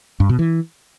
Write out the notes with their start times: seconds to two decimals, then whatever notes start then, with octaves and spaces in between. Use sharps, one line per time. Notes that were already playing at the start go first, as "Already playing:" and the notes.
0.20 G2
0.29 B2
0.39 E3